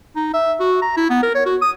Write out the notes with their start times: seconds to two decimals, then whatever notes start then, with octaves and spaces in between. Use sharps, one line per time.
0.16 D#4
0.34 E5
0.60 F#4
0.82 A#5
0.97 E4
1.10 B3
1.23 A#4
1.35 C#5
1.46 F#4
1.62 D#6